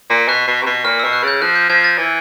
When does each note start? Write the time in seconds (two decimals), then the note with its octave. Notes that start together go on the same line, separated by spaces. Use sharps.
0.10 A#2
0.28 B2 F#6
0.47 B2
0.62 C3
0.66 B2
0.85 A#2 F6
0.99 E6
1.04 B2
1.13 F#6
1.23 C#3 G6
1.42 F3 F#6
1.56 G6
1.69 F3 G#6
1.84 A6
1.98 E3